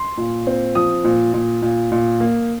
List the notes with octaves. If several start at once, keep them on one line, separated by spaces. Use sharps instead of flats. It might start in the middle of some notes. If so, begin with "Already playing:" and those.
Already playing: C6
A#2
C4
F3 D#6
A#2
A#2
A#2
A#2
A#3